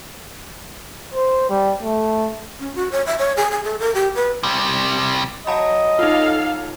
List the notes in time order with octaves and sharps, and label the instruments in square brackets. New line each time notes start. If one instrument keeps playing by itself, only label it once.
[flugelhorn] C5
G3
A3
[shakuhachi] C#4
F#4
C#5
E5
C#5
G#4
G#4
A4
A#4
G4
B4
[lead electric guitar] C3 G3
[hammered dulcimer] F#3 [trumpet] D#5 [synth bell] F5 A5 B5
[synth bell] D#4 F4 [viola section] A4 F5